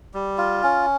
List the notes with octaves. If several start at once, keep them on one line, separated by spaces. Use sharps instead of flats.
G3
F4
C#4